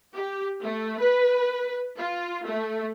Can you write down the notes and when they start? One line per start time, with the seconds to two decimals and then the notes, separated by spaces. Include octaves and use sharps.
0.14 G4
0.62 A3
0.99 B4
1.98 F4
2.46 A3